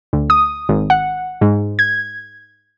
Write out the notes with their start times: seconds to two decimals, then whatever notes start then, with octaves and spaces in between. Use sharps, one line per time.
0.13 D2
0.30 D#6
0.69 G#1
0.90 F#5
1.41 G#2
1.79 G#6